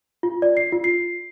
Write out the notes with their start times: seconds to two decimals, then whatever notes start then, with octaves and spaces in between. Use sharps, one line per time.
0.23 F4
0.42 D5
0.57 C7
0.72 F4
0.84 C7